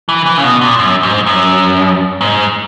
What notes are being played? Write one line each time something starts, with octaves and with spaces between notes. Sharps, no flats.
E3
E3
C#3
B2
A#2
F#2
G#2
F#2
G#2